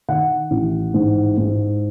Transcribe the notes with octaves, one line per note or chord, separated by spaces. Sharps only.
D#3 F#5
A1
G#2
G#2